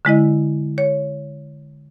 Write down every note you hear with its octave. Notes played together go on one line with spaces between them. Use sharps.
D3 G#3 E4 D#5
C#5